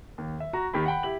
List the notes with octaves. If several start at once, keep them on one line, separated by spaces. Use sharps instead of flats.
D#2
E5
F#4 A#5
D#2 D#3 G4 B5
F#5 G5 B5
E4 G4 F#7